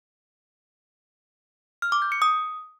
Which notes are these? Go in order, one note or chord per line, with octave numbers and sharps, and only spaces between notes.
F6
D6
G6
C#7
D#6